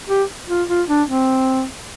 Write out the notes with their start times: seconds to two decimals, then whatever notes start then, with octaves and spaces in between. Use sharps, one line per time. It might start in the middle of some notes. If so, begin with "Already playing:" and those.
0.09 G4
0.49 F4
0.68 F4
0.88 D4
1.08 C4